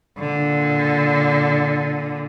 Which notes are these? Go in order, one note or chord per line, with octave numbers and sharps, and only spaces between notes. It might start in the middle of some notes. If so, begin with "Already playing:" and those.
A#2 D3